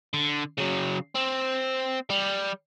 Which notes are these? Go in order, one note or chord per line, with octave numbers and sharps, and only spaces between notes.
D3
C#3 F#3
C4
G3